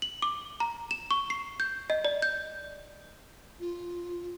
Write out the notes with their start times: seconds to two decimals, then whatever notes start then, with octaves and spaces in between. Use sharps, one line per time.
0.02 F#7
0.22 D6
0.60 A#5
0.91 E7
1.11 C#6
1.30 C7
1.60 G6
1.90 D#5
2.05 D5
2.22 G6
3.60 F4